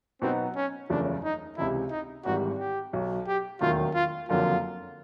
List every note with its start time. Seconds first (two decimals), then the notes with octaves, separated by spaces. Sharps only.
0.21 B2 F#3 B3 C4 D#4
0.56 C#4
0.90 F#1 E2 C#3 F3 A3 D4
1.24 D#4
1.57 C#2 C3 E3 E4
1.91 D#4
2.25 G#1 G#2 E3 G3 F#4
2.59 G4
2.93 B1 B2 F#3
3.28 G4
3.61 E1 D#2 D#3 F#3 A3 F4
3.94 F4
4.28 F#1 F2 D3 F#3 A#3 F4